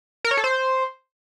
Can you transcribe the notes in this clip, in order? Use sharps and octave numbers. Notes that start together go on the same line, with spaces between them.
A#4
C#5
A4
C5